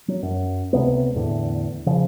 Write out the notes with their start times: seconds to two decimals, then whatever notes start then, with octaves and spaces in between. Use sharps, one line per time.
0.08 F#3
0.23 F#2
0.73 C#2 C3 A3 B3
1.15 E2 A2 D3
1.86 C#3 F3